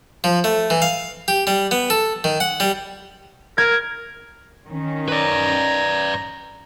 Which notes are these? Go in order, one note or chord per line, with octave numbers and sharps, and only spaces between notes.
F3
A3
E3
F5
G4
G3
B3
A4
D#3
F#5
G3
A#4 G#6
D#3 C#4
B4 D5 A#5